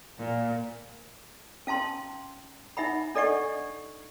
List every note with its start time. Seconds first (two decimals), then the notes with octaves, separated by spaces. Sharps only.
0.19 A#2
1.67 C#4 F5 A5 C6
2.77 D#4 E5 F#5 B5
3.15 D4 A4 D5 D#5 F#5 C#6